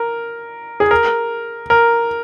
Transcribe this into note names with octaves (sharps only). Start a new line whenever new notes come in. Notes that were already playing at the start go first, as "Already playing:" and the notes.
Already playing: A#4
G#4
A#4
A#4